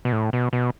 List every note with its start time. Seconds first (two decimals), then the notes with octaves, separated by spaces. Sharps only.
0.05 B2
0.12 A2
0.33 B2
0.53 B2